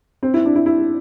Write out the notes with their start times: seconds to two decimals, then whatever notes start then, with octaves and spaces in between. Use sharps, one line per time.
0.23 C4
0.34 E4
0.45 D4
0.55 E4
0.66 E4